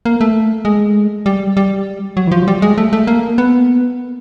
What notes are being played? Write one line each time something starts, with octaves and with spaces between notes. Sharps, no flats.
A#3
A3
G#3
G3
G3
F#3
E3
F3
F#3
G3
G#3
A3
A3
A#3
B3